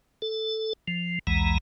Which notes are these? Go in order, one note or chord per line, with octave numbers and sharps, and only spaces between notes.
A4
F3
B1 E2 E3 G#3 A#5